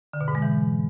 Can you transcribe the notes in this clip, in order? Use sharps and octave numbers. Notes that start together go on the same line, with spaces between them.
D3
B2
G#2
G#3
E3